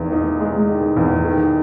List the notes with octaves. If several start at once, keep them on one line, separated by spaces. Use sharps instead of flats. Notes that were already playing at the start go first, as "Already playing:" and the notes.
Already playing: E2 D#3
D#4
G#3
D#3
E2
D#3